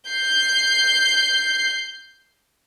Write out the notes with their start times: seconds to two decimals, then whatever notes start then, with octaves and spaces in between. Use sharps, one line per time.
0.11 G6 C7